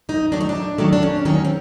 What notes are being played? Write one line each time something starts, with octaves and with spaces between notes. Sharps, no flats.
F#2 D#4
D#3 F#3 A3 D4
D#4
D4
F#2
D#3 F#3 A3
D4
F#2 C#4
D#3 F#3 A3 C#4
C4